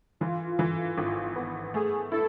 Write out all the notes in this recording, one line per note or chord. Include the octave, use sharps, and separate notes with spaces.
E3 F4
E3
G#1
B3
A3 G#4
E4 A4